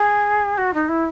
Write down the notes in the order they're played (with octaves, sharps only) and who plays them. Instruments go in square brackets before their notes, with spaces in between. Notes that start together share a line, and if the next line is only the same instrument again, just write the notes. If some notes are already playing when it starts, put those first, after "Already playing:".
Already playing: [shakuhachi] G#4
F#4
D#4
E4